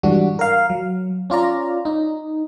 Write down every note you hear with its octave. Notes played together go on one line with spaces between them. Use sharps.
G#2 E3 G3 D4 F#4
A#4 F5
F#3
C#4 F4 D5 A#5
D#4